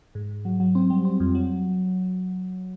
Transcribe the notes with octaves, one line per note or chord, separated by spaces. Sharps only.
G#2
G#2
F#3
F#3
C4
G3
C4
F2
F#3